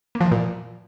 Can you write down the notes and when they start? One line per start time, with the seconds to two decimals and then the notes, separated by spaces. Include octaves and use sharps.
0.15 A#3
0.21 F3
0.26 E3
0.32 A#2